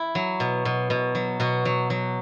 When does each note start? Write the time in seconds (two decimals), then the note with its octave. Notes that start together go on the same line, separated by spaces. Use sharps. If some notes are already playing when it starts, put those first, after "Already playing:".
Already playing: E4
0.15 F#3
0.40 B2
0.65 B2
0.90 B2
1.15 F#3
1.40 B2 F#4
1.65 F#3
1.90 F#3